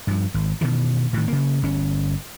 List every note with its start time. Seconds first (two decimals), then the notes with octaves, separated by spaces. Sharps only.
0.07 G2 F3
0.34 G#1
0.61 B2 D#3 E3
1.13 A2 D#3
1.28 C#3 A#3
1.63 G1 C#4